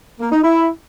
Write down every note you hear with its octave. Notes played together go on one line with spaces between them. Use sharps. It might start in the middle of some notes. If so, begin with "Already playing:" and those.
A#3
D#4
E4